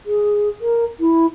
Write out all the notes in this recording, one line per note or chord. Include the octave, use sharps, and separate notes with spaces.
G#4
A#4
E4